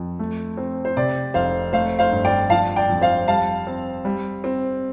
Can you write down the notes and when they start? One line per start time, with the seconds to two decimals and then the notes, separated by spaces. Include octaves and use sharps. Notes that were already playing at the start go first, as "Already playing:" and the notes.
Already playing: F2
0.19 A3
0.57 C4
0.85 C5
0.97 C3 D5
1.34 F1 C5 F5
1.73 A3 C5 F5
1.99 C5 F5
2.12 G2
2.25 D5 G5
2.50 F3 F5 A5
2.76 D5 G5
2.89 F2
3.01 C5 F5
3.28 G3 F5 A5
3.67 C4
4.05 G3
4.44 C4